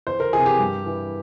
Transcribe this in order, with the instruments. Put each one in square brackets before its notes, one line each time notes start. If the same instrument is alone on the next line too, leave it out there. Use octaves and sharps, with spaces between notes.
[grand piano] E2 C5
A#4
E3 G#4
C3
G4
G2
E3